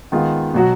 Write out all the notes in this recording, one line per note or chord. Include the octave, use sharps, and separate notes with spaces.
D#3 G#3 B3 F4
B2 F#3 B3 F#4